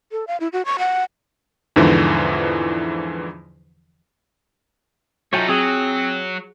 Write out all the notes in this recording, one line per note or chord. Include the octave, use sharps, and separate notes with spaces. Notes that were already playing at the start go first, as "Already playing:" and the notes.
A4
F5
E4
F#4
C#6
F#5
E2 G#2 D3 E3 F3
F#3 A3 D#4 F4 C#5 G5 G#5
F#3 C4 G#4 F#5 G#5 D#6